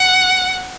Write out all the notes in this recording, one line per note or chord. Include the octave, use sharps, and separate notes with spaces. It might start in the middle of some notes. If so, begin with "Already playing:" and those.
Already playing: F#5